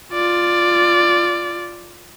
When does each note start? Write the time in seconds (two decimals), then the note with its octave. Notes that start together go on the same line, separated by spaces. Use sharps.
0.13 F4 D5